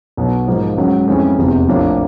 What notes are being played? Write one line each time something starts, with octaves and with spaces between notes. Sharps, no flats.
B1 B2 F#3
G#2 F3 A#3 D#4
C#2 C#3 F#3
F2 C#3 E3 G#3 C#4
F1 E2 C3 E3
A#1 A2 F3 A#3 D4